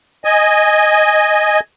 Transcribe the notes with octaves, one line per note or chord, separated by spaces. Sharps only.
D#5 G#5